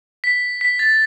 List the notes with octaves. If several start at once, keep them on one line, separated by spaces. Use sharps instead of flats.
B6
B6
A6